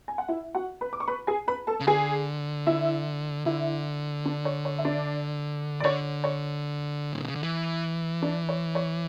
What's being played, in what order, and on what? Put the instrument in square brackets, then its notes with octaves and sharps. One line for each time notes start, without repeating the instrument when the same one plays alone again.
[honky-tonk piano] G#5
F#5
E4 E5
F#4 F#5
B4 B5
D6
C#6
B4 B5
G#4 G#5
B4 B5
A4 A5
[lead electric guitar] C#3
[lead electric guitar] D3 [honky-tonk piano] G#4 G#5
[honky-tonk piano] E4 E5
[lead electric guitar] D3 [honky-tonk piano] E4 E5
[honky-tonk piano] D4 D5
C#5
C#5
E5
D4 D5
D5
[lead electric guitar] D3 [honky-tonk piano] C#5
[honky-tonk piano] C#5
[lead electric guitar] A2
B2
C#3
D3
E3
[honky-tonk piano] D4 D5
C#5
C#5